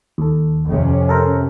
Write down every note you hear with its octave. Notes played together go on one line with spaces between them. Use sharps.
D#2 A4
F2 C3 C#4
A4 A#4 C5